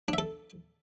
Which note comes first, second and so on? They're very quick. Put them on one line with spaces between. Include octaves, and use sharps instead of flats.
D4 E5 A4